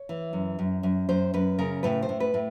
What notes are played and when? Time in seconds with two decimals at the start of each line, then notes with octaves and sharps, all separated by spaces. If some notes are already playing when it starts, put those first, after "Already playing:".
Already playing: C#5
0.09 E3
0.33 F#2
0.59 F#2
0.83 F#2
1.09 F#2 C5
1.34 F#2 B4
1.59 C#3 A#4
1.83 A2 B4
2.02 C5
2.09 A2
2.20 B4
2.34 A2